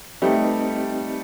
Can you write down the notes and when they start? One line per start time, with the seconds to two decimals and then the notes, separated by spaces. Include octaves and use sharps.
0.22 G3 A3 C4 D#4 G4 B4 D#5